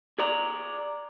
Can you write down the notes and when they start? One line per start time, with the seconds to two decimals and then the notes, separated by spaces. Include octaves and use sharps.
0.19 G#4 D5 A#5